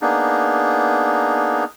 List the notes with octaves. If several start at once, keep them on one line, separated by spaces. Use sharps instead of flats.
A#3 B3 D4 D#4 G#4